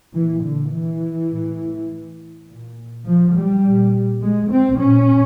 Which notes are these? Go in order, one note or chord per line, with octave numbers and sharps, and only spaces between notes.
A#2 E3
D3
E3
A2
A#2
F3
G3
A#2
G#3
C4
A#2 C#4